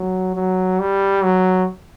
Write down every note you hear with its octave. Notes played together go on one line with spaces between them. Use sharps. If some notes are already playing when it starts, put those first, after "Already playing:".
Already playing: F#3
F#3
G3
F#3